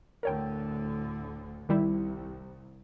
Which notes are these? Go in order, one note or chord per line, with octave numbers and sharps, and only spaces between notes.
D2 A2 D3 A#4 C#5 G5
C2 D#3 G3 E4